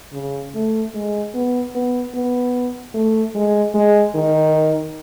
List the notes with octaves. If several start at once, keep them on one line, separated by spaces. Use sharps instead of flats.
C#3
A3
G#3
B3
B3
B3
A3
G#3
G#3
D#3